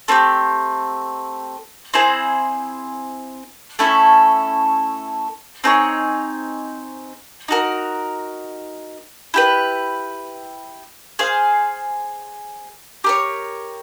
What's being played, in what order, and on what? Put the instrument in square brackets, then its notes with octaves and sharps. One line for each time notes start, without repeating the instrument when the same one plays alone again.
[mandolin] A3 C4 E4 G4
C4 E4 G#4 C5
A3 C#4 E4 A4
C4 D#4 G#4 C#5
D#4 F#4 A#4
E4 G4 B4
G#4 C5 F5
G4 A#4 C#5